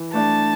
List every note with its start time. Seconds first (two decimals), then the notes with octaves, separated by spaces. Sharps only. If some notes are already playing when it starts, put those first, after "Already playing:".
Already playing: E3
0.14 A3 D4 A5